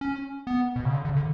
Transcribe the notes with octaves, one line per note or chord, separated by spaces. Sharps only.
C#4
B3
B2
C#3
D3
C#3
D3